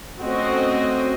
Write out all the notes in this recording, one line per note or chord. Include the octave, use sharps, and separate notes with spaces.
A3 C4 C#4 F#4 D#5